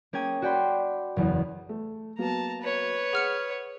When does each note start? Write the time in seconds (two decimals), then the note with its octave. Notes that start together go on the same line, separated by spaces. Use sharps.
0.13 A#3 C#4 G#4 G5 G#6 D#7
0.42 F#4 D5 G5 B5 C6
1.16 F#1 E2
1.69 A3
2.18 F#3 A#3 B3 A5 A#5
2.61 B4 C#5
3.13 G#4 F#5 F6 C#7